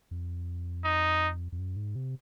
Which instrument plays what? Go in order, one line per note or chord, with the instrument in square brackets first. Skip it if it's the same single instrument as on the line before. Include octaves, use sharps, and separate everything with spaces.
[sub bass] F2
[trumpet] D#4
[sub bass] F2
F#2
G#2
C3